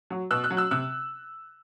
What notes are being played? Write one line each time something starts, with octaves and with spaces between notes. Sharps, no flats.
F#3
B2 E6 F#6
E6 F#6
F#3
E6 F#6
C3 E6 F#6